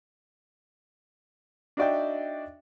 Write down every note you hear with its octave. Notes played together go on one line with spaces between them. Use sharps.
D4 D#4 F#4 D5 E5 G5